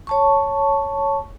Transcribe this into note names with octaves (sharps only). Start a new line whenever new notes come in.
C#5 A5 C#6